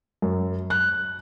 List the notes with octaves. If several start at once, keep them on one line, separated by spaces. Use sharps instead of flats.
F#2
F#6